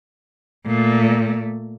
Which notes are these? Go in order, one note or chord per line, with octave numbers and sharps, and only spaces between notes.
A#2 A3